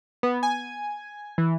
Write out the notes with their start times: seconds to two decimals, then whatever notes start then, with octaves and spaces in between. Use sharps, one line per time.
0.23 B3
0.43 G#5
1.38 E3